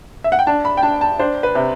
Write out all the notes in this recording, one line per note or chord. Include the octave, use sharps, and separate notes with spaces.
E5
F#5
G5
D4 A5
B5
G5
D4 A5
A5
D4 C5
B4
C3